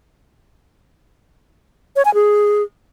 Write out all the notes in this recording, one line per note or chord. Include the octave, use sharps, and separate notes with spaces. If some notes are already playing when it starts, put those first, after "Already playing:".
C#5
G#5
G#4